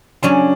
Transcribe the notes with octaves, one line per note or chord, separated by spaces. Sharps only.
C#3 F#3 C#4 D4